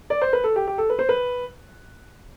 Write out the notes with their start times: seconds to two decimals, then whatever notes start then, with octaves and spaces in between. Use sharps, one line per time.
0.10 D5
0.21 C5
0.33 B4
0.44 A4
0.56 G4
0.67 G4
0.78 A4
0.90 B4
0.99 C5
1.09 B4